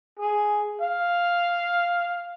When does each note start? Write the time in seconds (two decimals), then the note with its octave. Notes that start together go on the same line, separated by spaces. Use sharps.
0.19 G#4
0.81 F5